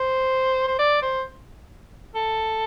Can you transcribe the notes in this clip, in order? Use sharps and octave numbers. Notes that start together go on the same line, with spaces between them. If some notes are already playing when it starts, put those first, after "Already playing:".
Already playing: C5
C5
D5
C5
A4